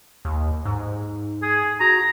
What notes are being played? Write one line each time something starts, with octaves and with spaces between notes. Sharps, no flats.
D#2
G#2
G#4
F#4 A#5